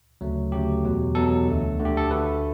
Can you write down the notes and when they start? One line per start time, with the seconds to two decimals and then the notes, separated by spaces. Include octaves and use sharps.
0.21 D2 C#3 F#3 A3
0.52 D2 C#3 F#3 A3 G4
0.84 E2 B2 F#3
1.15 E2 B2 F#3 A4
1.48 D2 D3 A3
1.79 D2 D3 A3
1.85 G4
1.97 A4
2.11 D2 D3 A3 B4